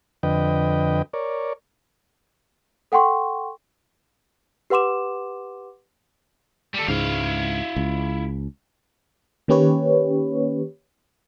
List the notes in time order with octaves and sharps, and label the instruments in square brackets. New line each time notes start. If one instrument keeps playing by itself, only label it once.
[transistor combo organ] F2 D3 B4 D#5 G5
A#4 C#5 D5
[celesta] A4 F#5 G5 C6 C#6
G4 B4 F#5 C6 D6 E7
[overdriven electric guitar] G3 A4
[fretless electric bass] C#2 G#2 [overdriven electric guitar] E4 F5
[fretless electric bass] C#2
[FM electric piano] D#3 A#3 C#4 G4 B4 C#5